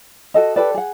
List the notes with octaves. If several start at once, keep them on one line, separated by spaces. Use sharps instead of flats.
F#4 A4 D#5
G4 A4 B4 D5
G#4 F#5